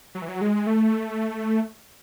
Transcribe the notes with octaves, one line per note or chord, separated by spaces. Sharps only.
F#3
E3
F#3
G#3
A3